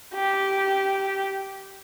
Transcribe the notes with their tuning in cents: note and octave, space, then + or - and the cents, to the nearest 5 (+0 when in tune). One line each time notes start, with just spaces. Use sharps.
G4 -10